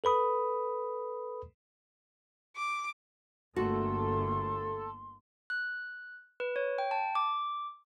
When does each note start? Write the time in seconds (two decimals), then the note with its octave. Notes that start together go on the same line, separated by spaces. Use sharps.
0.04 A4 B4 B5 D#6
2.56 D6
3.56 G1 A3 A#3 F#4 A4 C6
5.50 F#6
6.40 B4
6.56 C#5
6.78 G5
6.91 A5
7.15 D6